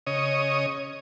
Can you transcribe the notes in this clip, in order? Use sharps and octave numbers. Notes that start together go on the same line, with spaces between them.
C#3 C#5 D#5 D#6